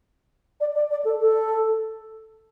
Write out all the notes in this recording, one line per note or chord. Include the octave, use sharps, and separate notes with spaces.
D5
D5
D5
A4
A4